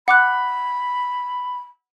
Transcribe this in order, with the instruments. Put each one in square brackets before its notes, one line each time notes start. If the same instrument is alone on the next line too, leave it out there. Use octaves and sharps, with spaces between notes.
[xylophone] F#5 D6 F#6 [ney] B5